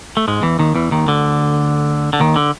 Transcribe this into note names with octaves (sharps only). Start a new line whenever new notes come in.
A3
G#2 G#3
E2 E3
D#2 D#3
E2 E3
D#2 D#3
D2 D3
D3
D#2 D#3
D3